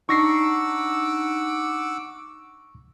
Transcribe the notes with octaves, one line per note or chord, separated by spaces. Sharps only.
D4 D#4 F#5 C#6 D6 E6 A#6 C7